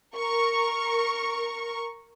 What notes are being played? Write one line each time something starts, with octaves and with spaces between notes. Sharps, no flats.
A#4 C#6